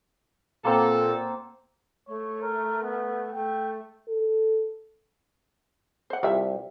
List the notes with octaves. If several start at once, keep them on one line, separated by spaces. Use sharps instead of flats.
A#2 A#3 C4 A4 F#5
A3 C#5
A#4
B3
A3 G5
A4
C5 F#5
C2 F4 G4 E5